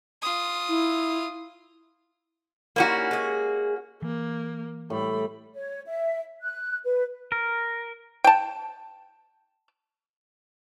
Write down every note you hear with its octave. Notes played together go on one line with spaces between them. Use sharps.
F4 D#6
E4
G3 A#3 C#4 D#4 E4 F#4
G#3 G#4
E3 A#3
A2 G3 B5
C#5
E5
F#6
B4
A#4
G5 A5